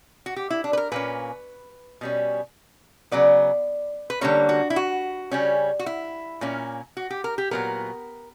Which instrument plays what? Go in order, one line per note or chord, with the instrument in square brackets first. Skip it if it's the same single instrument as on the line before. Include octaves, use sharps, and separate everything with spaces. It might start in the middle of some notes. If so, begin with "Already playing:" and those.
[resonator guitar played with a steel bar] F#4
G4
E4
D4
B4
A#4
A#2 A#3 C#4 B4
B2 G3 C#4
C#3 F#3 B3 D5
B4
D3 G3 A#3 C#4 C#5
F#4
E4
F#4
C#3 G3 C#4
F#4
E4
A#2 A#3 C#4
F#4
G4
A#4
G4
A#2 F#3 B3 A#4